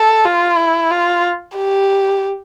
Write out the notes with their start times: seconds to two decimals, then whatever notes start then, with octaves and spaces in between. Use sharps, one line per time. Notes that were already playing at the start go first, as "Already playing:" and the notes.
Already playing: A4
0.25 F4
0.58 E4
0.91 F4
1.56 G4